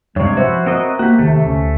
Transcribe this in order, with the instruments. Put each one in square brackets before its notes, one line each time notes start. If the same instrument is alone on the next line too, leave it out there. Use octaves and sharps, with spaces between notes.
[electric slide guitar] G2 C3 [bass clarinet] G#3 [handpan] C#5
[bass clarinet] F3 [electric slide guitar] F#4 [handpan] B4 C5 E5
[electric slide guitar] C4 F#4 D#5 [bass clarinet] A#4
[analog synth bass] A#3 [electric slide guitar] F#4 G4
[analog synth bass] D#2 [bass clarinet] C3 [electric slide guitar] A3
[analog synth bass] D2 [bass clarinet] C#4